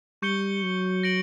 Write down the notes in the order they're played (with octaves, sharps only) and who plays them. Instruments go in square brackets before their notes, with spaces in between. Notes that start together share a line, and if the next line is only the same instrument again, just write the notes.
[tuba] G3 [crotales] C#6 G6 C#7 G7
[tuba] F#3
[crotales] A#6 D7 F#7